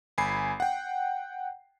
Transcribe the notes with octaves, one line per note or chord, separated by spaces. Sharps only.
G1 G#5 B5 C7
F#5 G5